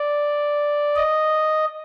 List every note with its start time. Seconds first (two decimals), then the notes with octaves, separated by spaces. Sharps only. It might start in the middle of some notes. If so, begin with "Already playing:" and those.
Already playing: D5
0.96 D#5